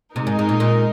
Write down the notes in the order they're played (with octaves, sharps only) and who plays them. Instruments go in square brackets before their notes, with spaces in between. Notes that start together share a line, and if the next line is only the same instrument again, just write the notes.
[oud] C3 [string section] G#3 D#4 A#4
[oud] G#2
G#2
A#2
A#2